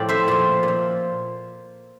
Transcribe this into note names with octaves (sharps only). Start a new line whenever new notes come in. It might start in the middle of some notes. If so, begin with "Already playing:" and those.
Already playing: A2 F3 D5 G5
C5 E5
A#2 F3
A#2
F3